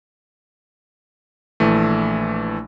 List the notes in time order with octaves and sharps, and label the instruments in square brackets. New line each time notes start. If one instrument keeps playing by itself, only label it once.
[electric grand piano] A#1 E3 A3